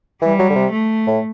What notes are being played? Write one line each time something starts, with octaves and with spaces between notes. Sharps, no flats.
E3 G3
F#3
D3
C3
A3
A2